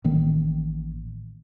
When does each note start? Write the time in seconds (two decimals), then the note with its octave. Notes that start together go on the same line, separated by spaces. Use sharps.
0.04 A1 D#3 A#3